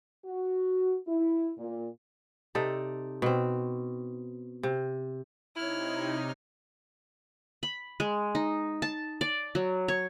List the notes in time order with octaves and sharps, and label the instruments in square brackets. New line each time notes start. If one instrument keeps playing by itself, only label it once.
[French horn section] F#4
E4
A#2
[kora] C3 D#4 A4 D5
B2 C4
C3
[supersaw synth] C3 D#4 [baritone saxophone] E4 [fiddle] C#5 F6
[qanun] B5
G#3
D#4
A5
D5
F#3
C#5